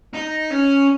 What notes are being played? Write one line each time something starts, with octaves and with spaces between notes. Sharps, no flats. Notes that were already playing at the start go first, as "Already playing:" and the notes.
D#4
C#4